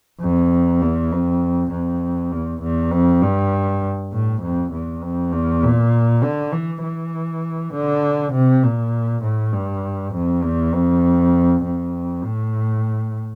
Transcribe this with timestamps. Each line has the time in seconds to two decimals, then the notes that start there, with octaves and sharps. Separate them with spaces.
0.21 F2
0.81 E2
1.12 F2
1.72 F2
2.32 E2
2.62 E2
2.92 F2
3.22 G2
4.12 A2
4.42 F2
4.72 E2
5.02 F2
5.32 E2
5.63 A#2
6.23 D3
6.52 E3
6.83 E3
7.74 D3
8.33 C3
8.64 A#2
9.23 A2
9.53 G2
10.14 F2
10.44 E2
10.73 F2
11.64 F2
12.24 A2